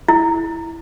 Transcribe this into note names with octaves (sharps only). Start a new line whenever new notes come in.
E4